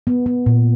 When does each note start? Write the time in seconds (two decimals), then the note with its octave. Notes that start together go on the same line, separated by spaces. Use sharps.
0.07 B3
0.26 B3
0.46 A#2